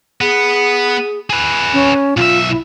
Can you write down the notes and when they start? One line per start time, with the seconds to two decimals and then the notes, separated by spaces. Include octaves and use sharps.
0.21 B3 G#4
1.30 G#4 B4
1.73 C#4
2.17 B1 F4 E5
2.49 E4